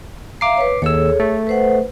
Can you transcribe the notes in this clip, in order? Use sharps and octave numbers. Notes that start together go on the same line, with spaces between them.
E5 F5 A#5 D6 C7
B4 C#5
D#2 G#4 A4 C#5 E6
A3
B4 C5 F#5